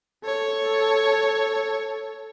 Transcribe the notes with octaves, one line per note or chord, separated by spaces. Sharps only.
A4 C#5